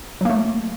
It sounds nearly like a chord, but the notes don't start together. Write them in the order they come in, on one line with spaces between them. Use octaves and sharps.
F#3 A#3 A3